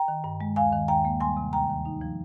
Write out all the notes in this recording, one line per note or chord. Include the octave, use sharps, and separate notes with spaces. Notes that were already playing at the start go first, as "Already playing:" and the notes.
Already playing: G5 A#5
D#3
G2
G#3
D#2 F5 G#5
D#3
D#2 G5 A#5
A#3
G3 G#5 C6
C3
D2 G5 A#5
D#3
D#4
F3